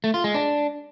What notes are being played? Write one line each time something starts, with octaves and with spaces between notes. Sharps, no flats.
A3
F4
G#3
D4